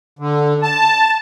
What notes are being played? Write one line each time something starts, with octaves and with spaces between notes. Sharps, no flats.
D3
A5